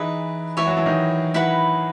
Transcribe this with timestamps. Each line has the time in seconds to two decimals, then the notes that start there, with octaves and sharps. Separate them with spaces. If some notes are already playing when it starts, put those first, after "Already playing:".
Already playing: E3 D#4 E4 G#4 B4
0.57 E3 E4 C#5 E5 G#5
0.67 F#3 F#4
0.77 E3 E4
0.86 D#3 D#4
1.34 E4 B4 F#5 B5